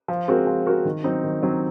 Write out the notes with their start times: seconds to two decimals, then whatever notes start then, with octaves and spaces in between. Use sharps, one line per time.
0.08 F3
0.28 G#3 C4 F#4 A#4
0.47 F3
0.66 G#3 C4 F#4 A#4
0.85 D#3
1.04 F#3 C4 D#4
1.24 D#3
1.42 F#3 C4 D#4